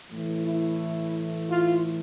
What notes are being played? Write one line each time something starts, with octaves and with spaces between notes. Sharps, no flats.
A2 E3 A3
E4
F4